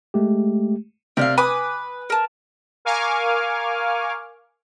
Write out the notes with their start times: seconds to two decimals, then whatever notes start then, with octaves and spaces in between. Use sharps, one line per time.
0.14 G#3 A3 G4
1.17 C3 A#4 D5 F5
1.38 B4 G#5 D6 D#6
2.10 A#4 A5
2.85 A#4 F5 G#5 C#6 D6 F6